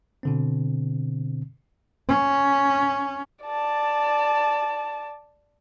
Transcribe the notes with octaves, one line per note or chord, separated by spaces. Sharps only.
B2 D3 C4
C#4
D5 A5